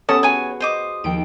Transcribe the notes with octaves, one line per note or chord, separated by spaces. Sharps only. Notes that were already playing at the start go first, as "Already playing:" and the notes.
B3 C#4 G4 A4 F#5 A5 D#6
F#4 G#4 C#5 G#5
C5 D#5 D6
D#2 F3 G5 D7